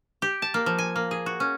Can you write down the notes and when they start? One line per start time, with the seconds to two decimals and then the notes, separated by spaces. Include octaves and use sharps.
0.22 G4
0.42 A5
0.54 A#3
0.66 F3
0.78 G#5
0.96 A#3
1.11 G#4
1.26 F#4
1.40 C#4